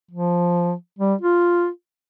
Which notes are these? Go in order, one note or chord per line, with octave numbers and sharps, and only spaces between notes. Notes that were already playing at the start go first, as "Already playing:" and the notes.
F3
G3
F4